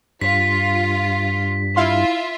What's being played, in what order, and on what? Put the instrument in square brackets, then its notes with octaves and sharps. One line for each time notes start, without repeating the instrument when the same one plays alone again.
[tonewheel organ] G2 [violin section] F4 [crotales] B6
[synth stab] E4 F5 C6 [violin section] F4 E5